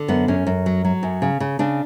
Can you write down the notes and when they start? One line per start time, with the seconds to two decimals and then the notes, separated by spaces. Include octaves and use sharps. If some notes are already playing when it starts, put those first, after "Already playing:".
Already playing: D3
0.08 F#2 B3
0.28 F#2 C#4
0.47 F#2
0.66 F#3
0.85 F#3
1.03 F#2
1.22 C#3
1.40 C#3
1.59 C#3 D4